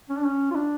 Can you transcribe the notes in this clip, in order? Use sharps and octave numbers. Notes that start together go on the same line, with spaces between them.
C#4
D4
C#4
F4
D4